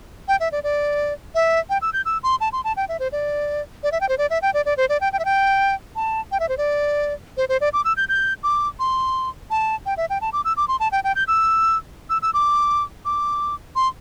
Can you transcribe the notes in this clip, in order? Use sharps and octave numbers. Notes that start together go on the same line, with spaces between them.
G5
E5
D5
D5
E5
G5
E6
G6
E6
C6
A5
C6
A5
G5
E5
C5
D5
D5
E5
G5
C5
D5
E5
G5
D5
D5
C5
D5
G5
G5
E5
G5
A5
G5
E5
C5
D5
C5
C5
D5
D6
E6
G6
G6
D6
C6
A5
G5
E5
G5
A5
D6
E6
D6
C6
A5
G5
G5
G6
E6
E6
E6
D6
D6
C6